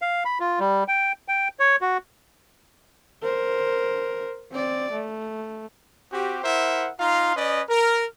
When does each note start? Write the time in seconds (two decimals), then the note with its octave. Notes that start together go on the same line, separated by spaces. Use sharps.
0.02 F5
0.25 B5
0.40 F4
0.59 G3
0.88 G5
1.28 G5
1.59 C#5
1.81 F#4
3.23 A#4 C5
4.51 C4 D5
4.92 A3
6.12 C4 F#4 G4
6.44 E4 A#4 C5 E5 F#5
7.00 D#4 F4 F5 A#5 C6
7.36 C#4 B4 D5 D#5
7.69 A#4